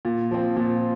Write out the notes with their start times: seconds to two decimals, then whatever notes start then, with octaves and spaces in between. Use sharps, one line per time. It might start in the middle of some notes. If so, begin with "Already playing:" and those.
0.05 A#2
0.31 F3 C4
0.57 A#2